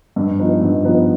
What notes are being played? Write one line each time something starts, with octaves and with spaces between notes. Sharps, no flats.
G2
F3 B3 D#4 B4
G2
F3 B3 D#4 B4